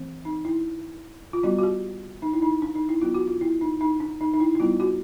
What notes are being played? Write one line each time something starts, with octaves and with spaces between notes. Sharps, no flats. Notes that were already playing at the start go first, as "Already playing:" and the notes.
Already playing: E3 A3 C4
D#4
E4
F4
G3 B3 D4 F#4
F#4
G4
D#4
E4
D#4
D4
D#4
E4
F#3 B3 D4 F4
F#4
F4
E4
D#4
D#4
D4
D#4
D#4
E4
E4
G3 B3 D4 F4
F#4